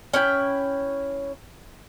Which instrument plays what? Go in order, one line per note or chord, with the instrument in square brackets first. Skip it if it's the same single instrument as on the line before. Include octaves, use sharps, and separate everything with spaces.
[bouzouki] C#4 E4 G5